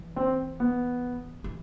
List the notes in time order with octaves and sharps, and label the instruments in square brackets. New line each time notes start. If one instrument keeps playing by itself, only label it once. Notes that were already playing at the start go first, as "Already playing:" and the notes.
Already playing: [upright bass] E3
[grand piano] C4
B3
[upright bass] E3